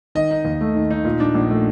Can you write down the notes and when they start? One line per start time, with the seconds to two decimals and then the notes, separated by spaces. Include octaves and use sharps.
0.15 D#3 D#5
0.31 D#4
0.45 D#2
0.61 A3
0.75 D#3
0.91 D#4
1.05 A#2
1.20 D4
1.35 A#1
1.50 A3